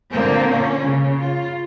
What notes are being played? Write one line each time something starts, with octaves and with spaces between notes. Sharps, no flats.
A#2 D3 A#3 C4
C#4
C#3
F4